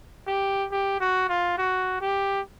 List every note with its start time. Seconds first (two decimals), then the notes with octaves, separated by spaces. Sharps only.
0.27 G4
0.71 G4
1.00 F#4
1.29 F4
1.58 F#4
2.01 G4